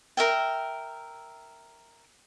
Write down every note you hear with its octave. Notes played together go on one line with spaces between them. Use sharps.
A#4 E5 G5